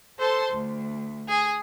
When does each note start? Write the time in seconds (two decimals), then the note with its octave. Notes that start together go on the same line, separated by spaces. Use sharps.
0.19 A4 C5 A5 C6
0.53 D2
1.28 G#4